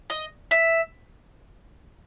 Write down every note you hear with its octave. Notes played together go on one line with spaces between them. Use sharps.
D#5
E5